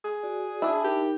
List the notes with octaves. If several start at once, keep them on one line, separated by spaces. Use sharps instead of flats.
G#4
F#4 D5
D4 E4
D#4 G4 A#4